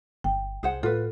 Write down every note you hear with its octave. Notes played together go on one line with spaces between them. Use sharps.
G1 G5
C2 G#4 C5 F#5
A2 F4 A4 B4